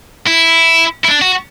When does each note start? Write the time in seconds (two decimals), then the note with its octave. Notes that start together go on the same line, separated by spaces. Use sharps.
0.27 E4
1.04 E4
1.08 D4
1.21 F#4